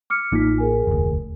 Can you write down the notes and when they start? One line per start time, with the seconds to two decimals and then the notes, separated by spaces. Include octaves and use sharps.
0.10 D6 F6 C#7
0.32 A1 A#3 D#4 F4 B6
0.58 G#4 A#4 G#5
0.87 F1 D2